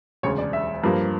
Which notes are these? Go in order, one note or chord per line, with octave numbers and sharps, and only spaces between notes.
E1 D2 C#3 C#5
D5
E5
G2 F3 A#3